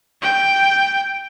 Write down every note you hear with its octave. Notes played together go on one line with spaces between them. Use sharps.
G5